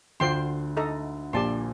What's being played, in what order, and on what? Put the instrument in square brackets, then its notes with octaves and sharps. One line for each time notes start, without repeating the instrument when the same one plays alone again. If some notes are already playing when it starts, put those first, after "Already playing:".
[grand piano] D2 D3 [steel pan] F4 C5 G5 C6
[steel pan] D#4 A4 D#5 A#5
[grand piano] A#1 A#2 [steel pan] G4 D5 A5 C6